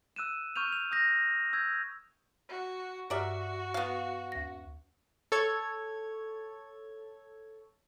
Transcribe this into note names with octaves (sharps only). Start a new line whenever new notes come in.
E6 F#6 D#7 E7
C#6 F6 G6 D#7 F7
F7
D#6 G6 A#6
E6 G6 G#6
F#4
G2 F#4 G4 A#4 D5 E5 F6
B3 F5
D#2 A#6
A4 C#5 G#6